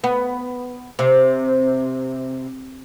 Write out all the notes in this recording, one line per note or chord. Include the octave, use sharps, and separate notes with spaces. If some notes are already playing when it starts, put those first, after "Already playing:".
B3
C3